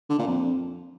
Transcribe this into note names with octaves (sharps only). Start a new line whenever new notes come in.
D3
A#2
F2